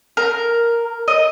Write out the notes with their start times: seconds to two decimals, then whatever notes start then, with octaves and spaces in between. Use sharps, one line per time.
0.17 A#4
1.08 D#5